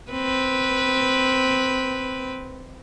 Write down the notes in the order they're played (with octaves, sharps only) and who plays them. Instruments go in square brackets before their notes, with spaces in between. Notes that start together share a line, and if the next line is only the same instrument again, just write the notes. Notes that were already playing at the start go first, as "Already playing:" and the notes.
[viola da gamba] C4 B4